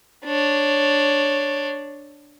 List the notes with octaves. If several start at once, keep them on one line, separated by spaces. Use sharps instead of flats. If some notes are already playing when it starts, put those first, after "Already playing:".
D4 C#5